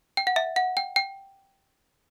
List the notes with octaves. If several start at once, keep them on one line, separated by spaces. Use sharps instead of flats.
G5
F#5
E5
F#5
G5
G5